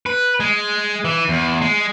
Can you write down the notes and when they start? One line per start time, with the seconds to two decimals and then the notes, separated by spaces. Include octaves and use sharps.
0.06 B4
0.40 G#3
1.05 E3
1.29 E2
1.62 G#3